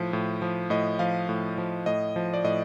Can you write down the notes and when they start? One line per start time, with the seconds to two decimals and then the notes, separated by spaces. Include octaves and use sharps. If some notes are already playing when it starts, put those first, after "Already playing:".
Already playing: A2 F3
0.13 A2
0.42 F3
0.70 A2 D#5
0.99 F3 F5
1.29 A2
1.58 F3
1.86 A2 D#5
2.16 F3
2.34 D5
2.44 A2 D#5